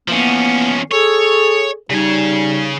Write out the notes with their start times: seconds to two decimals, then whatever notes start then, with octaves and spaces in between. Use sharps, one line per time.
0.08 E3 F3 A#3 B3 C#4
0.92 G#4 A4 C#5
1.90 C#3 G3 D#4 G#5